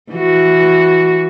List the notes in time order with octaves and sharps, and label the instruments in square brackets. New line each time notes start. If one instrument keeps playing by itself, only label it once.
[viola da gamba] E3 F#4